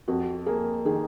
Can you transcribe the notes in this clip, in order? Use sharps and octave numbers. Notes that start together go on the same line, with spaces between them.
F2 F#4
A#3 G#4
D#3 G#4